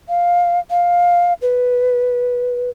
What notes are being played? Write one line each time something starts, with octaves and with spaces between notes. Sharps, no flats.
F5
F5
B4